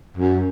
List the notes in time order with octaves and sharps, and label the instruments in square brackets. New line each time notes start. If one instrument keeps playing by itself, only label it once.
[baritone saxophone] F#2